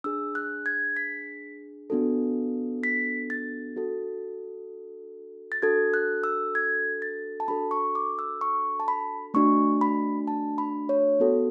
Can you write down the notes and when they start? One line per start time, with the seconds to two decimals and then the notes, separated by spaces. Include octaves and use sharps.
0.04 D4 G#4 E6
0.35 F#6
0.66 G#6
0.96 B6
1.90 B3 D4 F#4 A4
2.83 B6
3.30 A6
3.76 D4 F#4 A4
5.52 A6
5.62 D4 F#4 A4 G#6
5.94 F#6
6.24 E6
6.55 G#6
7.02 A6
7.40 A5
7.48 D4 F#4 A4 B5
7.71 C#6
7.95 D6
8.19 E6
8.41 C#6
8.80 A5
8.88 B5
9.34 A3 D4 F#4 C#6
9.81 B5
10.27 A5
10.58 B5
10.89 C#5
11.20 B3 F#4 A4